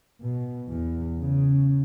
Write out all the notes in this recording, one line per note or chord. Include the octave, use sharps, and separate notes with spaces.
B2
E2
C#3